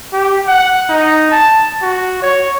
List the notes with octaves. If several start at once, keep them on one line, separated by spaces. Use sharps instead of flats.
G4
F#5
D#4
A5
F#4
C#5